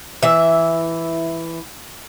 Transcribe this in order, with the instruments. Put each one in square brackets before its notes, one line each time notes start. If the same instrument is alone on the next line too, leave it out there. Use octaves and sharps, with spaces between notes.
[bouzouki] E3 E5